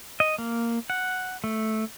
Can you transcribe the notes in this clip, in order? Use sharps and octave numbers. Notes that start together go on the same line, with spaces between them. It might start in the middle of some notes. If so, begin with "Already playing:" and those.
D#5
A#3
F#5
A3